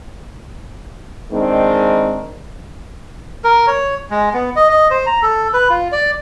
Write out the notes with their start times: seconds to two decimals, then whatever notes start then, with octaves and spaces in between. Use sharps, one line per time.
1.32 D#3 G#3 C4 D4 D#4
3.44 A#4
3.67 C#5
4.10 G#3
4.34 B3
4.56 D#5
4.69 D#5
4.91 C5
5.06 A#5
5.22 A4
5.54 B4
5.70 F4
5.92 D5